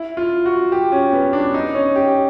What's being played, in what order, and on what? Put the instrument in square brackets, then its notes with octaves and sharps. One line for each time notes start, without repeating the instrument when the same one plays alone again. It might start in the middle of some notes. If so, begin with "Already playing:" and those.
Already playing: [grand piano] E4
F4
F#4
G4
C#4
B3
D4
D#4
C#4
G4